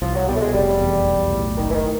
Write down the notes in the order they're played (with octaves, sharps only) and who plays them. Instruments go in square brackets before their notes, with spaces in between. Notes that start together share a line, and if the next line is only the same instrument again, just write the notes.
[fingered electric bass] C2 [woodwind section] F3
[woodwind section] F#3
[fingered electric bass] B2 [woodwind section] G3
[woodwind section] A3
G#3
[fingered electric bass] F1 [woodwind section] G3
[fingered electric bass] E2
B1
A2
[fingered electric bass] F#1 [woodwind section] D#3
[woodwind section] E3
D#3